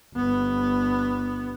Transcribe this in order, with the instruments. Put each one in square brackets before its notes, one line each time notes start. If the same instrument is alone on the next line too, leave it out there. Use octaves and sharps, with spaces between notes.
[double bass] G1 B3